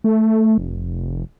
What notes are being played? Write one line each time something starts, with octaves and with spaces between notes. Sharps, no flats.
A3
F1